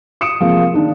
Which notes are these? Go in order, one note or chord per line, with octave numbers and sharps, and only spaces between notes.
D#6 C#7 D7 E7
C3 F3 G#3 A#3
D#3 D4 D#4